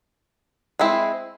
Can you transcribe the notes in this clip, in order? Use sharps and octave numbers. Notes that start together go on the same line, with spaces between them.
G#3 C4 E4